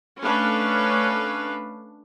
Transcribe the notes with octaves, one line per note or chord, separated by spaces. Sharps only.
A3 C#4 D4 B4 F5